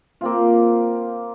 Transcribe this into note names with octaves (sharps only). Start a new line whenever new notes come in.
A#3 C4 F4